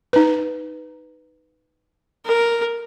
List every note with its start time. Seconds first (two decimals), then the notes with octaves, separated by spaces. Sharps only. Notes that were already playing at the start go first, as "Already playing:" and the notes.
0.13 D#4 B4
2.26 A#4